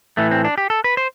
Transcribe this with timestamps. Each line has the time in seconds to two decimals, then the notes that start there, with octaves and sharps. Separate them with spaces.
0.17 A2 E3 A3
0.31 C4
0.44 D4
0.58 G4
0.70 A4
0.84 B4
0.97 C5